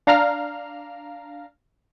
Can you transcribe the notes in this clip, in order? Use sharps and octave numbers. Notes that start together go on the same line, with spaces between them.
D4 F5 A#5 F6